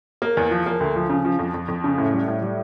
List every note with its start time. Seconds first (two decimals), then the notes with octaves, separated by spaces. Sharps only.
0.22 A#3
0.37 E2
0.51 F3
0.66 A#3
0.80 D2
0.96 F3
1.10 C#3
1.25 F3
1.39 F2
1.54 F2
1.68 F2
1.84 C#3
1.98 A2
2.13 G3
2.28 A2
2.42 G3